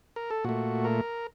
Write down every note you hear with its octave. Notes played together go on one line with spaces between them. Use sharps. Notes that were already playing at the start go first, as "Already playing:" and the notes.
A#4
A4
A#2 A3 F#4
A#4